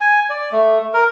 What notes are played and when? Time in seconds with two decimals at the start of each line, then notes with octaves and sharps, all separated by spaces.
0.01 G#5
0.30 D5
0.52 A3
0.94 A#4